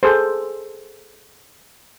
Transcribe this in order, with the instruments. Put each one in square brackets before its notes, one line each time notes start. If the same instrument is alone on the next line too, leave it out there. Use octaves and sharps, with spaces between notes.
[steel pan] G#4 A4 C5